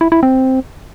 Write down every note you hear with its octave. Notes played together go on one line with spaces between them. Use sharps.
E4
E4
C4